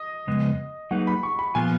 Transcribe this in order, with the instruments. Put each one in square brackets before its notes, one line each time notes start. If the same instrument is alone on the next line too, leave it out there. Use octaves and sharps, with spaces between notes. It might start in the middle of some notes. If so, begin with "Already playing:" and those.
Already playing: [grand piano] D#5
[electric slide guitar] F2 C#3 G#3 B3
[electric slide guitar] F#3 A#3 D#4 G#4 B4 [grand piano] F#5
[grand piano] B5
C#6
B5
[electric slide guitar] A#2 F3 B3 F4 [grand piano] G#5